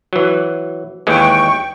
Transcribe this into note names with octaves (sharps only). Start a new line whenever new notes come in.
E3 F#3
D#2 E3 G#3 G5 C#6